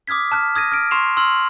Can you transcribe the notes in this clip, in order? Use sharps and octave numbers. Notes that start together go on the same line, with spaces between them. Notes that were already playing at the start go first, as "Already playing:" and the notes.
D6 D#6 F6 G#6 B6
A5 F6 F#6
D#6 G#6 A#6 D#7
F6 D7
C6 C#6 C7 E7 F7
C6 E6 F6 F#7